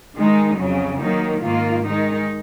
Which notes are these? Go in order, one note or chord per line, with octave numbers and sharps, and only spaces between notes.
D#3 G#3 D#4
F2 C#3 F#3
D#3 F#3 A#3 D#4
G#2 D#3 A#3 F4
D#3 G#3 D#4